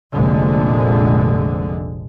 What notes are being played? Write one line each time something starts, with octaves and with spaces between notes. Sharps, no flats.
F1 A#1 A#2 D3 G#3